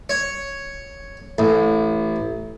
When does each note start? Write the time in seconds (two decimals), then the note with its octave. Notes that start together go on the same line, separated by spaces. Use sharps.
0.09 C#5
1.38 A1